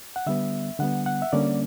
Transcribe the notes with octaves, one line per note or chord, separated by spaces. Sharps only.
F#5
D3 G3 B3 E5
D3 G3 B3 F#5
F#5
E5
D3 G3 A#3 C#4 D5